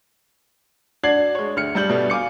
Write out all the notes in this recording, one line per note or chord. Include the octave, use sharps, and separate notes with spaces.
D4 F#4 D5 G#6 C7 F#7
G#3 C#5
D2 F6 C#7
G2 G3 G6 F#7
B2 G3 A3
F5 G#5 D6 C#7